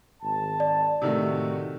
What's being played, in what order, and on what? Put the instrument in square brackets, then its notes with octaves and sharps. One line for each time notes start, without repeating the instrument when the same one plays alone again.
[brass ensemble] G#1 A5
[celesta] D5
[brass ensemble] A2 F#4 [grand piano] C3 D#3 A3